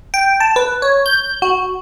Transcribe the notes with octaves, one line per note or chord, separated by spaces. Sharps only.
G5
A5
B4
C#5
G6
F#4